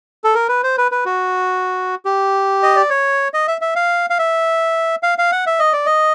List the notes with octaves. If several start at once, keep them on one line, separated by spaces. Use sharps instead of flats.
A4
A#4
B4
C5
B4
B4
F#4
G4
D#5
D5
C#5
D#5
E5
E5
F5
F5
E5
F5
F5
F#5
E5
D#5
D5
D#5